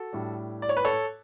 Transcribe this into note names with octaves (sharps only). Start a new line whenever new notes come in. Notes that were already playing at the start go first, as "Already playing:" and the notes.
Already playing: F#4 A4
A2 G3 D4
D5
C#5
B4
A4 C#5